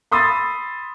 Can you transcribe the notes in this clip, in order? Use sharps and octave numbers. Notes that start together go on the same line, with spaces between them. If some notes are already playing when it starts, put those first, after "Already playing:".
B5 C6 D#6 E6 A6